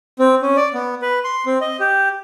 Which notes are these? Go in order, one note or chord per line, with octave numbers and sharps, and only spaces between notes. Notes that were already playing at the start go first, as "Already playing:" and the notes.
C4
C#4
D5
B3
B4
C6
C4
D#5
G4